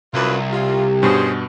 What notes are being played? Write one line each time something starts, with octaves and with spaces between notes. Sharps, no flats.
C2 F#2 F4 B4
F4 G4
G2 B2 C#4 G#4 C5